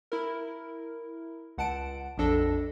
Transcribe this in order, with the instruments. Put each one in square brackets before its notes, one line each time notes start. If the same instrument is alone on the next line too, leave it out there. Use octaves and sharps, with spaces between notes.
[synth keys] E4 A#4
C#2 F#5 A5 D7
A#1 F2 D4 A4 A#6